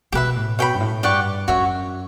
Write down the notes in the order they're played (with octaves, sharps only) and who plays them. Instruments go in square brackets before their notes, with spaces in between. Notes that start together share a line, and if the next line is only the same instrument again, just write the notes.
[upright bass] B2 [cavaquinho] G4 B4 E5
[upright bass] A2
[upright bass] B2 [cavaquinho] C#5 G5 B5
[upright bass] G2
A2
[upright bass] G2 [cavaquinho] G4 D5 F#5 C#6
[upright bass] F#2 [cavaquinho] F#4 C#5 E5